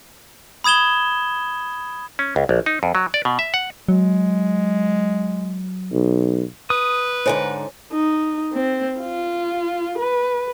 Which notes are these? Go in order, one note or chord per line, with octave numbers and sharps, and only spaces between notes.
B5 D#6 G#6 E7 G7
C#4
C#2
A#1
D#4
F2
F#3
D5
B2
E5
F#5
F#3 G#3
B1
B4 D#6
G#2 D3 D#4 C5 C#5 G#5
D#4
C4
F4
B4